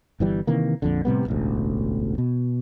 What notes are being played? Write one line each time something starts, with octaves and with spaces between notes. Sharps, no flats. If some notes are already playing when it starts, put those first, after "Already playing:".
G1 E3 G3
C3 D#3 E3 A#3
A#1 F2 D3
A2 C3 G3 B3
E1 A1 D2
B2